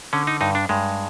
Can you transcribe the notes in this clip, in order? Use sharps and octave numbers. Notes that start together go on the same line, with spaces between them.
D3 C#4
D#4
G2 D#4
D4
G2 G#3